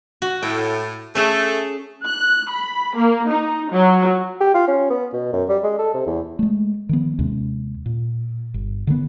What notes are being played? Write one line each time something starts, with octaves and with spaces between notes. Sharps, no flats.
F#4
A2 G5
A3 C#4 G#4
F#6
B5
A#3
D#4
F#3
G4
F4
C#4
B3
B2
F#2
G3
G#3
A4
C3
E2
G#3 A3
D#3 F3 B3
D#2 C3 G#3 C#4
A#2
G1
D3 D#3 F3 B3